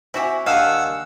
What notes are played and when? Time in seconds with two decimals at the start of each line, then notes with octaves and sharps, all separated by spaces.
0.14 C4 E4 F#4 G4 E5 G#5
0.46 D#2 D4 F5 F#5 G#5 D#6 E6 E7